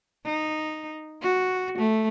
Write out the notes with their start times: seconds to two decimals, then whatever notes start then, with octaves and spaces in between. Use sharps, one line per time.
0.25 D#4
1.22 F#4
1.78 A3